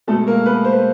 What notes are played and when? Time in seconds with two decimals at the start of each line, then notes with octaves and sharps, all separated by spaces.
0.07 G#3 A3 A4
0.11 B2
0.27 A#3 A#4
0.46 B3 B4
0.65 C5
0.72 B4